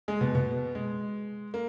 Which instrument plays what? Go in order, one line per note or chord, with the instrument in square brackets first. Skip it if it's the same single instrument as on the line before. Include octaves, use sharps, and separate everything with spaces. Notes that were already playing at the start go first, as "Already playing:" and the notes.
[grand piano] G#3 G#4
B2 B3
B2 B3
G#3
A#3